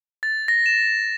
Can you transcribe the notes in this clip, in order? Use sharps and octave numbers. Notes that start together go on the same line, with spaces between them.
A6
A#6
E7